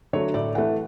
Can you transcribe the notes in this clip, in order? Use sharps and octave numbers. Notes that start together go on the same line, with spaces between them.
D3 F#3 A3 C#5
A2 D5
E3 A3 F#5